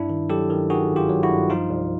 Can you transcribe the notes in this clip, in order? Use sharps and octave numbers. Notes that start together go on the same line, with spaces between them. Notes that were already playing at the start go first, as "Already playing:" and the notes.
Already playing: G2 D4 E4
D#3
F#3 G4 A4
D#3
D#3 F#4 G#4
G#1
F4 G4
F#3
E4 F#4
G2
F3 D#4 F4
C2